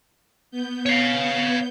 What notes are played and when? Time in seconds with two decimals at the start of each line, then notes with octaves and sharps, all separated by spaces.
0.51 B3 G6
0.86 C#5 F5